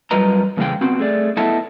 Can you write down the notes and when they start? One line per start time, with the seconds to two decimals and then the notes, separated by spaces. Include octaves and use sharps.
0.11 F#2 F3 G3 B4 D#5 A#5
0.57 E2 A#2 C#3 G#3 G#4 G5
0.81 B3 C4 F#4
0.99 A3 G#4 D5
1.37 B3 E4 A4 D#5 E5 A5